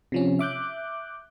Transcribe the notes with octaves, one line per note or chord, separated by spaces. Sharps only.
C3 F3 C#4
E5 D6 F#6 G6